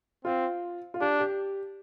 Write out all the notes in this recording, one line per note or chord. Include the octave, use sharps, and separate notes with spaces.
C4 F4
F4
D4 G4
G4